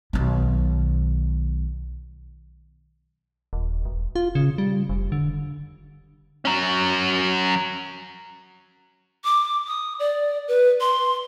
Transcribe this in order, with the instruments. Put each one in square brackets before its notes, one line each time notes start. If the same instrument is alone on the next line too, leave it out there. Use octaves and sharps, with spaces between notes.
[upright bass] B1 D#3
[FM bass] D#1
E1
F4
C#3
G3
F1
D3
[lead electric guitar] F#3 C#4
[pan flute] D6
D#6
D5
B4
C6